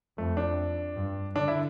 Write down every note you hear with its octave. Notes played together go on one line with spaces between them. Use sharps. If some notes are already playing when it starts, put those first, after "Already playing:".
F2 A3
D4
G2
D3 D4
E4